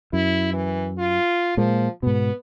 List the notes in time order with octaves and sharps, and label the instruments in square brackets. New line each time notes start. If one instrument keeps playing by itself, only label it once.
[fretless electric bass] F#2 [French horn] E4
[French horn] E3
F4
[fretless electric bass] A#2 G#3 A#3 [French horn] F3
[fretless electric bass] G#2 B2 [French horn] B3